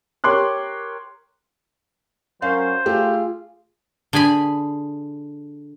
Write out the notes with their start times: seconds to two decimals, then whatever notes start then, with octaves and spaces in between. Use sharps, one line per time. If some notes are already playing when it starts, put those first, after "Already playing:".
0.24 G4 A#4 C#5 C6 D6 F#6
2.42 F#3 C#4 A#4 C5 F5
2.86 A3 F4 G4 G#4
4.13 D3 G#4 G#5 B5